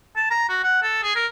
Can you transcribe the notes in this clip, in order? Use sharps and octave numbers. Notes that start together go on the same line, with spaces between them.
A5
A#5
F#4
F#5
A4
G#4
A#4